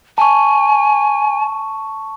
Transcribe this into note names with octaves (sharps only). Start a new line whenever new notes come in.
G#5 A5 C#6